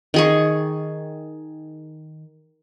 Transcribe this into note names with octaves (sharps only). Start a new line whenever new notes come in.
D#3 G#4 C#6